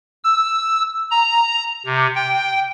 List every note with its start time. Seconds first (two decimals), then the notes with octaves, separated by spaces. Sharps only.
0.24 E6
1.11 A#5
1.85 C3
2.15 G5